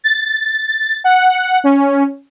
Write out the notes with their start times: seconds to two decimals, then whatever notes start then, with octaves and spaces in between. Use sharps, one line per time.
0.04 A6
1.04 F#5
1.64 C#4